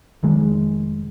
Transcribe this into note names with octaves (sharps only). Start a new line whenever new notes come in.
F1 D#3 G#3